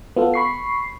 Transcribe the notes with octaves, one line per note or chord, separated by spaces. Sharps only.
B3 F4 A4
B5 C#6 C7